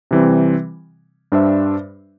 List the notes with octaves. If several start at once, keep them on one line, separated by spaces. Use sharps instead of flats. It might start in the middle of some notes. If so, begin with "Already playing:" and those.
C3 E3 G3 C4
G2 G3 D4 C5 E5